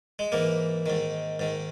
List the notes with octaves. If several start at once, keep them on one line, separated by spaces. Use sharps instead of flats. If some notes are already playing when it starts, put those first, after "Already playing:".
G#3
G#2 E3 A#3
G#2 D#3
G#2 D#3